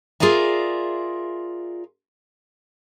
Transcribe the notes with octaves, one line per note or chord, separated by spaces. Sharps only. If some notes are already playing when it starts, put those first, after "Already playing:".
F4 G#4 A#4 D5 E5